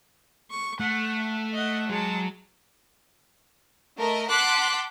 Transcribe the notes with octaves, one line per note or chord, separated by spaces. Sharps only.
C#6
A3 F#5
D#5 F#5
F#3 G#3 A5
A3 A#4 D#5
F#5 A5 C6 D6 F#6 B6